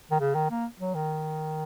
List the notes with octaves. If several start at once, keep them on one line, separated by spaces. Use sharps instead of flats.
D#3
C#3
D#3
A#3
F#3
D#3